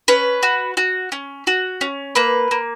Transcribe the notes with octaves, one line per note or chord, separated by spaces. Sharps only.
C#4 B4
F#4
F#4
C#4
F#4
C#4
A#3 B4
A#3